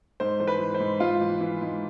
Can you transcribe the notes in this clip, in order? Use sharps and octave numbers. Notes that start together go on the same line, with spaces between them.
G#2 C5
E3 C5
B4
E3
C5
G#2
G#2 F4
E3
E3
G#2